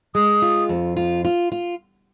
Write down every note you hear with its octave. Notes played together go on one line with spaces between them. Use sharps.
G#3 D#6
F4
F2
F4
F4
F4